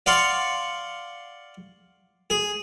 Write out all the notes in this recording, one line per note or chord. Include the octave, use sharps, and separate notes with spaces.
D5 F5 F#5 C6 C#6
G#4